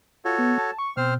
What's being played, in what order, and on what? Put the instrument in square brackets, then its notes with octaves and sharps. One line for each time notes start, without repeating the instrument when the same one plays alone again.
[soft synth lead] F4 [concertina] F#4 A4 C#5
[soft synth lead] B3
A5
C#6
[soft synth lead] B2 [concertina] C4 C5 F6